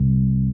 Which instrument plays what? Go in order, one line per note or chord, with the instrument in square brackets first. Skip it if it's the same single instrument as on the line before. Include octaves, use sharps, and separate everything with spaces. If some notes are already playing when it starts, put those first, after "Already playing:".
Already playing: [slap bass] C2